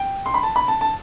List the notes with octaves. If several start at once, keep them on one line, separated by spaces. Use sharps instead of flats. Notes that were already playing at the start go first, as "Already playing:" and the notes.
Already playing: G5
C6
B5
A5
B5
A5
A5